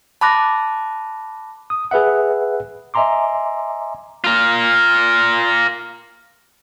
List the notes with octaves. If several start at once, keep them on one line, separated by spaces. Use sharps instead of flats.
A5 B5 D6 F#6 A#6
D#6
G#4 B4 E5 F#5
D#5 E5 G#5 A#5 C6 D6
F4 A#4